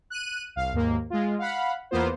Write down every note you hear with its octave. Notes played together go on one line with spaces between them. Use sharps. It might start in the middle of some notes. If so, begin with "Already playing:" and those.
F#6 D#7
C2 F5
D#2 G#2 A#3
G#3 F4
F5 F#5 B5
E2 A#3 B3 F4 C5